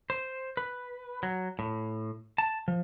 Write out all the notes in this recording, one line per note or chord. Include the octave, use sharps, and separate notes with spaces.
C5
B4
F#3
A2
A5
F3